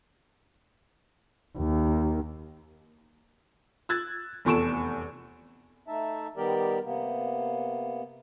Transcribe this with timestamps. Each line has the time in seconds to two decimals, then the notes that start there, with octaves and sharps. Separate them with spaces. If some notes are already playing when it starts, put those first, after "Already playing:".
1.57 D#2
3.89 E6 F#6 G#6 A6
4.45 F1 E2 A4 C#6 D7 E7
5.88 A3 D#4 E5 A5
6.37 D#3 G3 B3 G4 A#4 D5
6.84 C3 A#3 B3